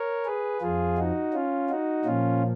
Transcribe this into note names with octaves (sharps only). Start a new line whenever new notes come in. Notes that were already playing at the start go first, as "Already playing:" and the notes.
Already playing: A#4 C#5
G#4 B4
F2 F3 F4 G#4
D#4 F#4
C#4 F4
D#4 F#4
A#2 F3 C#4 F4